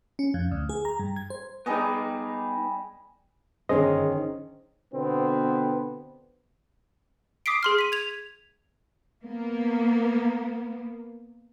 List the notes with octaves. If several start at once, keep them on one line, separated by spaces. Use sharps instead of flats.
C#4
F2
D2
G#4
A#5
G2
G#6
C5
G3 B3 D#4 G#4 D#5
G1 D#3 C#4 G#4 C5 D#5
B2 D3 B3 C4
D6 D#6 B6 C7 D7
G#4 C6 F6
B6 D#7
G#6 F7
A#3 B3